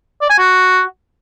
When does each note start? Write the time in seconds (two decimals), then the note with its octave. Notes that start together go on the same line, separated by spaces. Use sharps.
0.21 D5
0.30 G#5
0.39 F#4